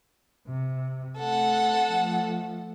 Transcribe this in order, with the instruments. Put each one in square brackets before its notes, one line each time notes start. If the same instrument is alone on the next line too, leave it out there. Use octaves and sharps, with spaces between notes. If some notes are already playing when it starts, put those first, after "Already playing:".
[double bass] C3
[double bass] A3 C4 [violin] A4 F#5
[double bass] F3 A3